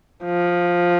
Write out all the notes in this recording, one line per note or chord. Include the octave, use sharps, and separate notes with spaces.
F3